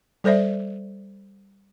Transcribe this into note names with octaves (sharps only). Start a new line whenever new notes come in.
G3 A4 C5 D5 E5